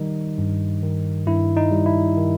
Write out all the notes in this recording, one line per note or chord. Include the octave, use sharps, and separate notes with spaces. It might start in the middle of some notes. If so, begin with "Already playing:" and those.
Already playing: D#3 G3 D#4
G2
D#3
G2 E4
D#4
G3
E4
D#3